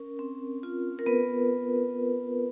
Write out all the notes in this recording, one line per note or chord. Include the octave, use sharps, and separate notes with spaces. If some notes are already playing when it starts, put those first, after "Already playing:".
Already playing: C#4 A#4
C4
F4
A#4
B3 B4